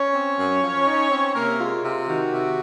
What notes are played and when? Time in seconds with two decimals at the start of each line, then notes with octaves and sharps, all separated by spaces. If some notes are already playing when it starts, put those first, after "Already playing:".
Already playing: C#4 C#5
0.14 C4
0.38 F#2
0.62 F3
0.87 D#4
1.11 C4
1.35 C3 A#3 A#4
1.60 G#3 F4
1.83 C3 F4
2.07 D#3 F#4
2.32 C3